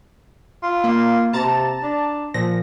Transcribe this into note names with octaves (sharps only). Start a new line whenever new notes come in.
F4
A#3
C3 A5 A#5 A6
D4
A#2 F3 A#6